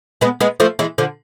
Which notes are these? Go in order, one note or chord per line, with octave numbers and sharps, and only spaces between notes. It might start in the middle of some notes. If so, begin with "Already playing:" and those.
G#3 B3
G#3 B3
F3 A3
E3 G#3
D3 F3